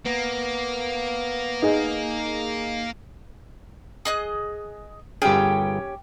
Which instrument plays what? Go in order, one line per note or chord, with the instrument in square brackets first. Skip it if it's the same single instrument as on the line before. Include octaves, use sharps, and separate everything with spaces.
[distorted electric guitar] A#3 [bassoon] B3
[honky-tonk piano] D#4 G#4
[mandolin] G#4 D#5 F#6
[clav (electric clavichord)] G1 G#4 [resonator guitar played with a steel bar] C#4 G4 [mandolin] G5